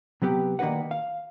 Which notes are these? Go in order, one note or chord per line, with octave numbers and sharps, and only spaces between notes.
C3 F#3 B3 G4
D#3 A#3 D4 F#4 B4 F#5
F5